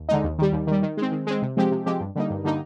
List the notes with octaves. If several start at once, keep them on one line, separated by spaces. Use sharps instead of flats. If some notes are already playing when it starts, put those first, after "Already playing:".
Already playing: D#2
D3 G#3 D#4
D#2
D#3 G3
D#2
D#3 G3
D#3
G#3 C4
D#3
G#3 C4
C3
F3 G#3 C4 G4
C3
F3 G#3 C4 G4
G2
D3 G3 A#3 D#4
G2
D3 G3 A#3 D#4